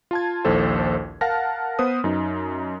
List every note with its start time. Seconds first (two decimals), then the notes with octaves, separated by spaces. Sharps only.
0.11 F4 A5 G#6
0.45 A#1 D#2 E4 A4 C5
1.21 A#4 F5 F#5 A5 F6 A#6
1.79 B3 B4 C5 D#6
2.04 F#2 D#4